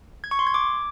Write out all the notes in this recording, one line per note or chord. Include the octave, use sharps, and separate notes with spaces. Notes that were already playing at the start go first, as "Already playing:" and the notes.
G#6
C#6
C6
G#6
D6